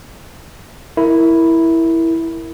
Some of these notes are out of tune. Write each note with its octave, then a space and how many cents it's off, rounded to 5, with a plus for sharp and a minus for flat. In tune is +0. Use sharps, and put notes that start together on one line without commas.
E4 +0 A#4 +0